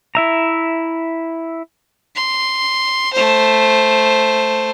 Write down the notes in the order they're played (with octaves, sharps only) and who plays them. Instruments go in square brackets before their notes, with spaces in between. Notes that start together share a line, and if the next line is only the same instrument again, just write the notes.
[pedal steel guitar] E4 E5 A#5
[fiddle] C6
A3 C5